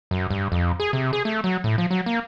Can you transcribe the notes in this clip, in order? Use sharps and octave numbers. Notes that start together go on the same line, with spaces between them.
F#2
G2
F2
G#4
C3
G#4
A3
F#3
A2
F3
F#3
A#3